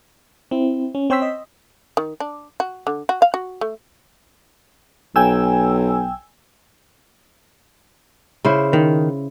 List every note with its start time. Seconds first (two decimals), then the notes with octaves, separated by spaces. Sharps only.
0.51 C4 E4
0.95 C#4
1.10 C4 C#5 G5 C6 E6 B6
1.22 D#5
1.97 D#3
2.20 D4
2.60 F#4
2.87 D3
3.09 F#4
3.22 F5
3.34 F#4
3.61 A3
5.16 B1 G5 G#5 E6
8.45 C#3 E4 C5
8.73 D#3